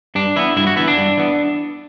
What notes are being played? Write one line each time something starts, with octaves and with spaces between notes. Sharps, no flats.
G2 D4
E3 B3 E4
G2 E4
F#4
E3 B3 E4
D4
G2
E3 B3